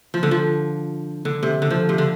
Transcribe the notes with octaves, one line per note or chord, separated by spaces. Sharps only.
F3
D3
F3
D3
C3
D3
F3
C3
D3